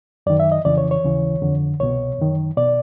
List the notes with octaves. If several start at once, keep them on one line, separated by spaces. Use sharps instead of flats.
F#2 D#3 D5
E5
D#5
F2 C#3 E3 D5
C#5
C#5
D#2 C#3 E3
F2 D3
C2 B2 C#5
F#2 D#3
B2 D5